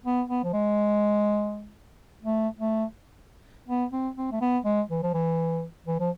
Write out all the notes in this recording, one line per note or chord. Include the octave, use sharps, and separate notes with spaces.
B3
B3
F3
G#3
A3
A3
B3
C4
C4
A3
B3
G#3
E3
F3
E3
E3
F3